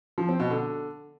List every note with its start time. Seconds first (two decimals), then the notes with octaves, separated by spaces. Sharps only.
0.18 F3
0.29 C4
0.40 B2
0.51 D3